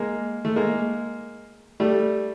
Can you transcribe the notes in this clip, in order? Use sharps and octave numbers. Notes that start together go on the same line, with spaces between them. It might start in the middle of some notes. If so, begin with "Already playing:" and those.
Already playing: G#3 A#3
A3
G#3 A#3
G3 A3